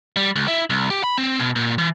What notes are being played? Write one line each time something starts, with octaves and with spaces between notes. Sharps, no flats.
G3
C#2
E4
C2
G4
B5
C4
B2
A#2
E3